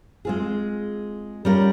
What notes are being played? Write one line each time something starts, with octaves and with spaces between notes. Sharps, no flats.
G#3 C4 F4 G#4
G3 C#4 F4 A#4